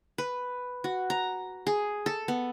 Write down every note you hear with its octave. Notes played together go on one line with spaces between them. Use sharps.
B4
F#4
A#5
G#4
A4
B3